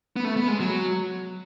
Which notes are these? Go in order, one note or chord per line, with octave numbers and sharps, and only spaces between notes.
B3
A3
B3
G#3
F#3